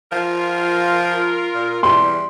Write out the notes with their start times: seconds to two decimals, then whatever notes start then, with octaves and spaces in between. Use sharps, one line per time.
0.12 F3 F4 A#4
1.54 A#2
1.83 E2 G3 C6